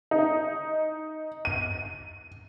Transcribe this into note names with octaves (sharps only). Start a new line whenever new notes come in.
D#4
D#7